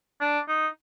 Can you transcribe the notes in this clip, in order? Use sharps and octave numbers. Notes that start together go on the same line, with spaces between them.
D4
D#4